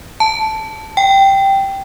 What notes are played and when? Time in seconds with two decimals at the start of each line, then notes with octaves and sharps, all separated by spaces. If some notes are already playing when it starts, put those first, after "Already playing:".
0.20 A5
0.97 G5